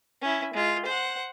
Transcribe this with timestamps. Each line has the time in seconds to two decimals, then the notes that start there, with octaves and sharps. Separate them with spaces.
0.22 C#4 E4
0.54 G#3 F4
0.86 C5 F#5